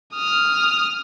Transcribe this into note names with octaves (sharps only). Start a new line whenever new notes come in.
D#6 F6